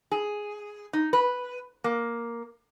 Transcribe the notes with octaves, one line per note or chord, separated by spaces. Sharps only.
G#4
D#4
B4
A#3